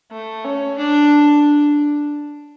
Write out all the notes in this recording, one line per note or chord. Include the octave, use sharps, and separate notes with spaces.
A3
C#4
D4